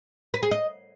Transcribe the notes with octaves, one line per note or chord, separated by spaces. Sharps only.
B4
G#4
D#5